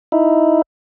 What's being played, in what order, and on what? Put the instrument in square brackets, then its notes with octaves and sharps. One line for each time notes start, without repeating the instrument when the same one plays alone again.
[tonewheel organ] D#4 E4